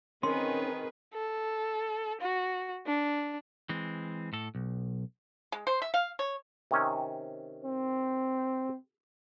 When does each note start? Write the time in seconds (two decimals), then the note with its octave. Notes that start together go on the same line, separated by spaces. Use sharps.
0.23 D#3 C4 C#4 G#4 B4 C6
1.14 A4
2.21 F#4
2.87 D4
3.69 E3 G#3 C4
4.33 A2 A4
4.55 B1
5.52 G#3
5.67 C5
5.82 E5
5.94 F5
6.19 C#5
6.71 C3 D#3 C#4
7.64 C4